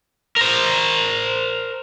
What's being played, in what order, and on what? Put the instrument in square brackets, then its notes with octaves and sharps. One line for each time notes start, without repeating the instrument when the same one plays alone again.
[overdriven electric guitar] A#4 C5